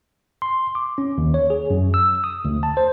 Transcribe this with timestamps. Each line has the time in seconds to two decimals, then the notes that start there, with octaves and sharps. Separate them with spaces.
0.42 C6
0.75 D6
0.98 C#4
1.18 D#2
1.34 C#5
1.50 G#4
1.70 F#2
1.94 E6
2.24 D#6
2.45 D2
2.63 A5
2.77 C5